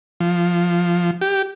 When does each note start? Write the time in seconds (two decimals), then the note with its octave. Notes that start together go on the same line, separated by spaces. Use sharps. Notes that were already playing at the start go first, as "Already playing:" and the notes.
0.20 F3
1.21 G4